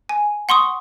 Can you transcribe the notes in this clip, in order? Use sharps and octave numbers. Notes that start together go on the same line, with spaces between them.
G#5
F#5 C6 C#6 D#6